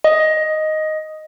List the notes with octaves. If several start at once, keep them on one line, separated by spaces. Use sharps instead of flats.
D#5